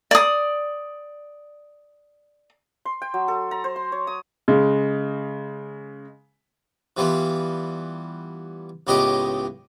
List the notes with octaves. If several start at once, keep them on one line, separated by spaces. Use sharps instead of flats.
D5 D#6
C6
G5
F#3
A4
A#5
C5
C6
C#5
D#6
C#3 G#3
E3 G3 B3 F4
C#2 A2 B3 G4 D#5 D6